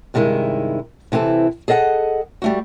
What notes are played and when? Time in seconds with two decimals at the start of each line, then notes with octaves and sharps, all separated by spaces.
0.14 G2 C3 D#3 G#3 E4
1.12 C3 E3 C4 E4 A4
1.68 G#4 A4 D#5 E5 F#5
2.42 G3 A3 F#4